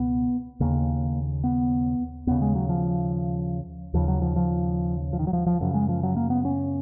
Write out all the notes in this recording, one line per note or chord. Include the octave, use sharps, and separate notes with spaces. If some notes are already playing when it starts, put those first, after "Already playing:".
Already playing: C#2 B2 B3
D#2 C#3 A#3
B3
D#2 C#3 B3
G#3
F#3
F3
D#2 C#3 F3
F#3
F3
F3
F3
D#3
F#3
F3
F3
F#2 C#3 F#3
G#3
F3
F#3
A#3
B3
C#4